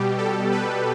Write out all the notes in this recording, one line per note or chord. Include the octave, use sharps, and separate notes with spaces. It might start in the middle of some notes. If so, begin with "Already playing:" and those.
Already playing: B2 G3 G4
A4
B4